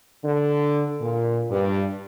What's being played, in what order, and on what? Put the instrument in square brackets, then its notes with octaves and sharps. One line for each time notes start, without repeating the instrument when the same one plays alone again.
[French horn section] D3
A#2
G2